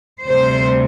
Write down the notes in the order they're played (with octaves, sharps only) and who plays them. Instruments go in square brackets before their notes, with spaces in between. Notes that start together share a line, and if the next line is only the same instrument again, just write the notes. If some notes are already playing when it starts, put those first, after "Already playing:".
[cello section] D2 C3 G3 C5